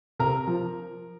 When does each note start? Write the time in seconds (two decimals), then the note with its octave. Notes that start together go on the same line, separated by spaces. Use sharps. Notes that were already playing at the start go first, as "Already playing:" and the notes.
0.19 C3 A#4 A#5
0.47 F3